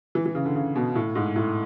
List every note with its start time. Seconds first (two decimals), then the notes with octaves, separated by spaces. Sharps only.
0.15 E3
0.26 E3
0.35 C#3
0.45 D3
0.55 C#3
0.76 B2
0.95 A2
1.15 G#2
1.36 A2